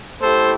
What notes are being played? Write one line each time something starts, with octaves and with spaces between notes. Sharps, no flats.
A3 E4 G4 A4 C5